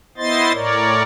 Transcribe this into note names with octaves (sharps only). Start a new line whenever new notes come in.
B3 E4 C5 D#5 C6 A6
A2 A#4 C#5 D5